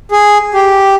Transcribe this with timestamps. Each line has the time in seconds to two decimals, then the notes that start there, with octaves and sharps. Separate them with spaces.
0.11 G#4
0.54 G4